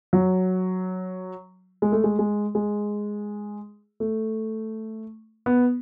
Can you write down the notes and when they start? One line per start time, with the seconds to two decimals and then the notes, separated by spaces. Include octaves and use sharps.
0.13 F#3
1.82 G#3
1.92 A3
2.04 G#3
2.19 G#3
2.55 G#3
4.00 A3
5.46 B3